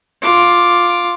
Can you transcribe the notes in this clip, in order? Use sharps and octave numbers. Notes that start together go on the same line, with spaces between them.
F4 D6